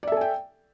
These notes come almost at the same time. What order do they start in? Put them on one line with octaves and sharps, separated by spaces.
D5 E5 A4 G#5 G5